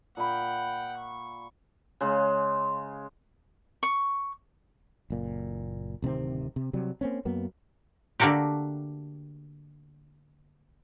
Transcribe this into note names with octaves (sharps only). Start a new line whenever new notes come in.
A#2 F#5 G5 B5
C#6
C#3 G#3
C#6
F#1 A#2
D1 C3 D#3 C4
C3
C3 F#3 G3
A#3 C4 C#4
F#2 F#3 A#3 B3
D3 A3 A#3 F#4 G4